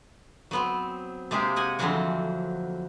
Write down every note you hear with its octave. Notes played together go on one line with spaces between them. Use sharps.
F#3 B3 C4
C3 G#3 A#3 G4 G#4 C5
D#5 F#5 G#5
F2 D3 E3 F#3 C4 F#4